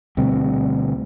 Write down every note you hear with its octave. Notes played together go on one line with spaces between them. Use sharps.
D2 B2 G3 C4